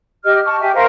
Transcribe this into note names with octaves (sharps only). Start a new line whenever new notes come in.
G4 D#5 F6
A5 C#6
G4 E5 G#5
A#4 C5 F5 C#6